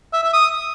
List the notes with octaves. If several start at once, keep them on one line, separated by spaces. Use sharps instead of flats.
E5
E5
D#6